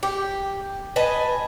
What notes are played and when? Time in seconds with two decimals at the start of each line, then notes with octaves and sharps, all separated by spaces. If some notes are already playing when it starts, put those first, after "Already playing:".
0.03 G4
0.96 B4 D#5 G#5 A5